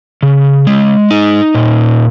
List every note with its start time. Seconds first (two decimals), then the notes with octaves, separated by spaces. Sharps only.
0.23 C#3
0.67 G#3
1.10 D#4
1.54 A#2